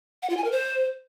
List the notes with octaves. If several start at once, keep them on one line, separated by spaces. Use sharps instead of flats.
F#5
F4
G#5
A#4
C5